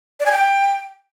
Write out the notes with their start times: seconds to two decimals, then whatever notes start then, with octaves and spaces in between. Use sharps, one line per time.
0.20 D5
0.25 G#5
0.31 G5